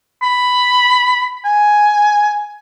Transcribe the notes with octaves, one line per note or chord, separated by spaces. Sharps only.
B5
G#5